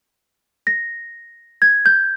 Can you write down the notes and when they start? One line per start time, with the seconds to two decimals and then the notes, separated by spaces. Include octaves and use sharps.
0.67 A#6
1.62 G#6
1.86 G6